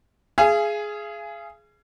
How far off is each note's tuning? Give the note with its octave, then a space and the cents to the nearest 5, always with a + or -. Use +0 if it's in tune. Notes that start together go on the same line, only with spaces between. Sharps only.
G#4 +10 F5 -40 G#5 +0